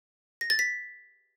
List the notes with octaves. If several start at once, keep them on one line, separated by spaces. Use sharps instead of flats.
A#6
A6
B6